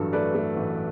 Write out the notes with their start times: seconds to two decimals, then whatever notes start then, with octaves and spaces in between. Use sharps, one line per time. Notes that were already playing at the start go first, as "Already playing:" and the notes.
Already playing: A1 G2 F#3 A4
0.13 A3 B4 D5
0.35 A3
0.57 A1